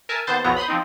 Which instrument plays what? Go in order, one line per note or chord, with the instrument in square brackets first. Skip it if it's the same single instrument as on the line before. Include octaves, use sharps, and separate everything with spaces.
[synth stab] A#4 E5 G#5 A5
D#2 B3 C5 A5 G6 A6
B1 E2 F3 F#3 B3 A#5
B5 C6 D#6 G6
F3 C4 D#4